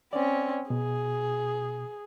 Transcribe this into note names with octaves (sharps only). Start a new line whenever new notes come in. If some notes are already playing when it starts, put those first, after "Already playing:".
C4 C#4 D5
B2 G#4